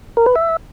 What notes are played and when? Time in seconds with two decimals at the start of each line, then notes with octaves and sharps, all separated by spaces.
0.17 A#4
0.26 B4
0.36 E5